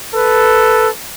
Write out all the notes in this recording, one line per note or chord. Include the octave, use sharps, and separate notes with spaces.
A4 B4